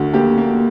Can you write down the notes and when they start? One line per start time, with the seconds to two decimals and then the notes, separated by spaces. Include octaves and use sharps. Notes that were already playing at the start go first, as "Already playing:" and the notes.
Already playing: D2 F#4
0.14 A#3 G4
0.37 A#3